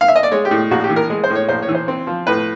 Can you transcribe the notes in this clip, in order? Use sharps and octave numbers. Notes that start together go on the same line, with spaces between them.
F5
E5
D#5
D5
G#3 C#5
G4
A2
A#1 F#4
G4
E3
A#4
G#3
C5
A2
C#5
A#1 C5
C#5
E3
C5
C4
F3
A2 B4